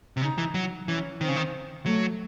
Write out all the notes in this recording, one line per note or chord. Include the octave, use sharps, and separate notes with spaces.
C3
C#3 D#4
E3
F#3
E3 C#4
D#3 C4
C#3
D#3
F#3 A3